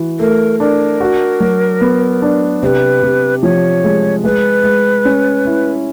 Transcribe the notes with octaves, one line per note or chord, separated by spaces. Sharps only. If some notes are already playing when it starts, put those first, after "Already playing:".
Already playing: E3 F#4
A3 A#4
D4 A#4
F#4
F#3
B3
D4
C3 B4 C5
C3
F3 C#5
G#3
G#3 B4
G#3
C#4
E4